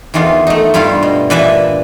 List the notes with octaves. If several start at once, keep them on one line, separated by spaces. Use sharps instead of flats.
E2 D#3 E3 B3 F4
A3 D#4
G2 G3 E4 F4 F5
B2
A#2 E3 D4 B4 D5 E5